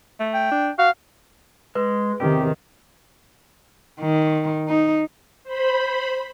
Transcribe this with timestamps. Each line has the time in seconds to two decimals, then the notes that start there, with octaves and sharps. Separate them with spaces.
0.20 A3
0.34 G5
0.51 D4
0.79 F#4 F5
1.75 G#3 B4
2.20 E2 C3 D#3 G4
4.00 D#3
4.68 D#4
5.44 C5 B5